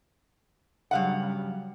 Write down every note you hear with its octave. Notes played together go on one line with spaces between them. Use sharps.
G2 C#3 F#3 G3 F5 F#5